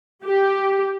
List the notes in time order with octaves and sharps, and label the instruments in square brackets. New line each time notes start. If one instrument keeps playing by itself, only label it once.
[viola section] G4